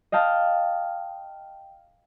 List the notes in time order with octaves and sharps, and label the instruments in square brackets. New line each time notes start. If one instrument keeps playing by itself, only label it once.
[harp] D#5 F5 G5 A5